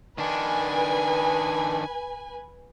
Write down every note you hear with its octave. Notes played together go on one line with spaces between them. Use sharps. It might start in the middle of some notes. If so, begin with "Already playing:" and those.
D#3 D4 B4 G#5